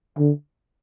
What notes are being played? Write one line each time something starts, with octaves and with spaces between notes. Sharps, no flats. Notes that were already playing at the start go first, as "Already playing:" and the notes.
D3